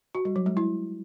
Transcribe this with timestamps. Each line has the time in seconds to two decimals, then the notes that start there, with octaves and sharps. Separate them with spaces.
0.15 F#4
0.25 G3
0.36 F#3
0.46 G#3
0.57 E4